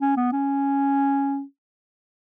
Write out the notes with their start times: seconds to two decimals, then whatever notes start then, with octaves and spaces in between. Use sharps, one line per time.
0.01 C#4
0.17 B3
0.32 C#4